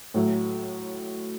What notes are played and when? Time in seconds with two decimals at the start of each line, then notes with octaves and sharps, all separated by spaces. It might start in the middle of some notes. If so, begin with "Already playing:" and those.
0.14 A2 F#3 A3